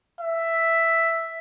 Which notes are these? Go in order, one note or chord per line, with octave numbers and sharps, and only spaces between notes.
E5